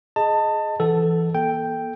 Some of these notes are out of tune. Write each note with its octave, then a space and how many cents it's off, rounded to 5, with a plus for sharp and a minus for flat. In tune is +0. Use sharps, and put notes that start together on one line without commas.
G#4 +15 D#5 +0 A5 +20
E3 +20 A4 +0 F#5 +5
A#3 +45 A4 +0 G5 +0